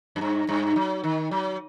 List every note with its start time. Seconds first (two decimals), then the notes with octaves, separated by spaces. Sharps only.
0.16 F#2
0.21 G2
0.49 G2
0.76 F#3
1.03 D#3
1.31 F#3